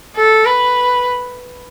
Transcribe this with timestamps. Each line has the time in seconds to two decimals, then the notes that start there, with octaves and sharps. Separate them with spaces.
0.17 A4
0.46 B4